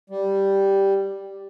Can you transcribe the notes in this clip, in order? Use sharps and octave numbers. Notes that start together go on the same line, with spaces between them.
G3